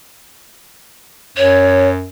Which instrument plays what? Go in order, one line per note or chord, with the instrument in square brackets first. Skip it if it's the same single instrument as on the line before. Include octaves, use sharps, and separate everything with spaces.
[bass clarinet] F#2 [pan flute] C#5